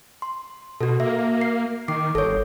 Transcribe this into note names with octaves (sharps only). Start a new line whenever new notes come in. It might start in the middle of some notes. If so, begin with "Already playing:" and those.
C6
B2 F#4 A4
A#3 E5
C7
D#3 D6 C7
G1 A4 C#5